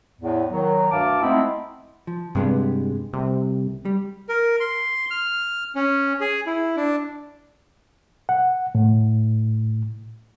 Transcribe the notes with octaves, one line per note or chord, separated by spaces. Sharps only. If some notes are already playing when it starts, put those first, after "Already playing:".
E2 A2
D#3 F#3
D2 G2 F5 A5 D6
G#3 A3 B3 C4 D#4 E4
F3
G2 C3 G#3 B3
C2 C3
G3
A#4
C6
F6
C#4
G#4
E4
D4
F#5
A2